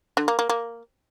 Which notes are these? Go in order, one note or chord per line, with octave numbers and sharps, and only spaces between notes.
D3
A#3
A#3
A#3